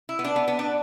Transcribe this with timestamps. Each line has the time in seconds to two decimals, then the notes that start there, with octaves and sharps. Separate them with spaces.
0.09 E4
0.19 B3
0.24 D4
0.36 B3
0.48 B3
0.59 D4